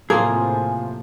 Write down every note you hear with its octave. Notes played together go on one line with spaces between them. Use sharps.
A2 C3 F3 A#3 F4 G#4 G#5